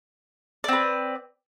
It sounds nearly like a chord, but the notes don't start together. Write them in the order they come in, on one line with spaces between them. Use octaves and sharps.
D5 C4 B4